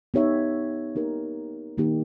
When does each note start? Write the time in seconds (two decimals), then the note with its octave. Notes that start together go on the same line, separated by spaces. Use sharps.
0.14 B3 D#4 G4 C#5 E5
0.95 A#3 D#4 G4 A#4
1.78 D#3 A#3 D#4 G4